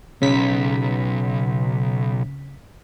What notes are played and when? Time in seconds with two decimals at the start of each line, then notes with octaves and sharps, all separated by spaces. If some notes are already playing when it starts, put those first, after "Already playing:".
0.22 B1 C#3 B6